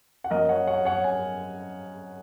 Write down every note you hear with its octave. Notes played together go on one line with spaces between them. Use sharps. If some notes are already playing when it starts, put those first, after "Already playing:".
F#5
F#2 F#3 A#3 C#4 A#4 D#5
C#5 F#5
C#5 F#5
C#5 F#5
G#5